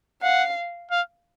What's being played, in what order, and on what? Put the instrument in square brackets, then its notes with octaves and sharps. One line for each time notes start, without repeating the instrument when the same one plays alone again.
[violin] F5 [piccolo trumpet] F#5
[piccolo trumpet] F5